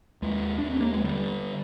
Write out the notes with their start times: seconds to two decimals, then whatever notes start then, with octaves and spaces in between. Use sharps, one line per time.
0.22 D#2 G#3
0.58 D4
0.63 D#2
0.70 C4
0.81 A#3
0.93 G#3
1.04 D3 G3